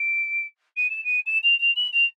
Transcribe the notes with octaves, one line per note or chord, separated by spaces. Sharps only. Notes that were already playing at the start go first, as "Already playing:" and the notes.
Already playing: D7
D#7
E7
D#7
E7
F7
F7
F#7
F7